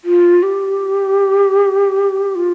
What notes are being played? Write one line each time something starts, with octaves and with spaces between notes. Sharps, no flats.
F4
G4
F4